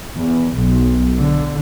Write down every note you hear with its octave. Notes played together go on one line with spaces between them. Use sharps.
E2
B1
D3